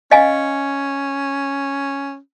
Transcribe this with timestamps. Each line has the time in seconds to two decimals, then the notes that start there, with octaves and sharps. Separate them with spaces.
0.11 C#4 D#5 F5 G#5